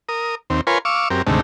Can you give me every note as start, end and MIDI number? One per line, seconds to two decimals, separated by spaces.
0.09 0.35 70
0.09 0.35 87
0.50 0.61 39
0.50 0.61 60
0.67 0.78 65
0.67 0.78 70
0.67 0.78 71
0.67 0.78 73
0.67 0.78 80
0.67 0.78 84
0.85 1.08 77
0.85 1.08 85
0.85 1.08 86
0.85 1.08 88
1.10 1.22 42
1.10 1.22 60
1.10 1.22 67
1.10 1.22 70
1.27 1.41 38
1.27 1.41 44
1.27 1.41 48
1.27 1.41 51
1.27 1.41 57